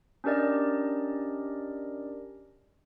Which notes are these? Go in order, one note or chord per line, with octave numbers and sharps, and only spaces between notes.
C#4 D4 G4 A#4 D5 D#5